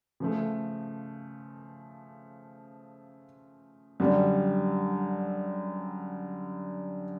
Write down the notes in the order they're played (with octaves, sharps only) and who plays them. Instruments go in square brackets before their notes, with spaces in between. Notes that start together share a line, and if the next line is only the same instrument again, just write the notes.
[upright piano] C#3 F3 A3
F#2 D3 G3